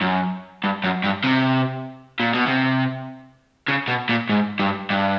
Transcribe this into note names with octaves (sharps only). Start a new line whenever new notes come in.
F#2
G2
F#2
G2
C3
A#2
B2
C3
C#3
B2
A#2
G#2
G2
G2